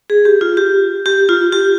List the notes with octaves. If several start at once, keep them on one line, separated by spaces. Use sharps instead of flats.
G#4
G4
F4
G4
G4
F4
G4